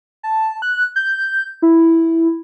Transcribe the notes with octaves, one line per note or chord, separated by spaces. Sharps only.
A5
F#6
G6
E4